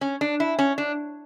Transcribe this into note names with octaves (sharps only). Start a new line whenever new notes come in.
C#4
D4
E4
C#4
D4